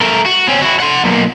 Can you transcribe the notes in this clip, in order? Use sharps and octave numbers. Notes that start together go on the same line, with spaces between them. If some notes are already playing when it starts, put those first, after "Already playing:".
A3 A#4
F#4
C4 C#4
E4 F#4
F#5 C6
B1 A#2